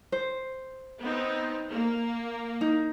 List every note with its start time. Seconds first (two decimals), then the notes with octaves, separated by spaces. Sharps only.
0.12 C5
1.01 B3 C4 D#4
1.70 A#3
2.61 D#4